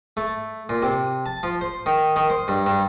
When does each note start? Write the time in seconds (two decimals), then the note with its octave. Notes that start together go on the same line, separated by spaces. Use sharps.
0.17 A3
0.69 A#2
0.82 C3
1.26 A5
1.43 F3
1.61 C5
1.86 D#3
2.16 D#3
2.30 C5
2.48 G2
2.66 G2